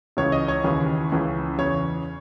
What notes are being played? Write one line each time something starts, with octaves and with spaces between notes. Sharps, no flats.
C#2 C#3 E3 C#5
D#5
C#5
D#2 C#3 E3
C#2 C#3 E3
E2 C#3 E3 C#5